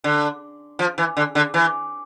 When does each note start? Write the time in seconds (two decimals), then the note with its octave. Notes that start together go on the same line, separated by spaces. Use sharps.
0.04 D3
0.79 F3
0.98 E3
1.17 D3
1.35 D3
1.54 E3